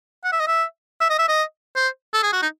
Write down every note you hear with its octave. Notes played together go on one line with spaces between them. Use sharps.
F#5
E5
D#5
E5
E5
D#5
E5
D#5
C5
A4
G#4
F#4
D#4